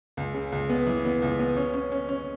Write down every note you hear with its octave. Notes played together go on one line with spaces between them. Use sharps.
C#2
C#3
C#2
B3
E3
B3
C#2
B3
C#4
C#4
C#4
C#4